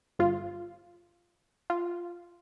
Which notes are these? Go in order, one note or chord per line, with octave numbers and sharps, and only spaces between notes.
G1 F4
F4